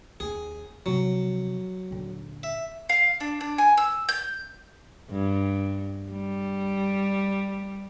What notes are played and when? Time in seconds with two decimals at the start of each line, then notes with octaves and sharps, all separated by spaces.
0.20 D#2 G#4
0.86 C3 F3 F#3
1.91 D#1 D3
2.43 E5
2.89 F5
3.20 D4
3.41 D4
3.58 G#5
3.77 E6
4.09 G6
5.11 G2
6.12 G3